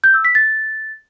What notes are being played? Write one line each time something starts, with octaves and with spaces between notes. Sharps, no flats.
G6
E6
B6
A6